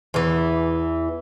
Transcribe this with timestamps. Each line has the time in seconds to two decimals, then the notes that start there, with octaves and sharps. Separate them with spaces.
0.14 E2 E3